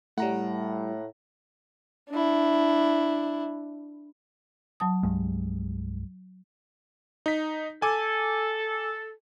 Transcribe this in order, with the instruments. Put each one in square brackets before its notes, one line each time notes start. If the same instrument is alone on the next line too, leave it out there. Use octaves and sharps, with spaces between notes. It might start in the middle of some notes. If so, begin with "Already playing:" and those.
[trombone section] A2 [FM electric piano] G3 E4 [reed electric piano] A3 [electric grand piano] F#5 A#5
[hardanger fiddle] D4 E4
[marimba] F#3 A5 D#6
[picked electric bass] C2 G2 G#3
[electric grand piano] D#4 B6
[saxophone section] A4 [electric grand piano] G#5 D6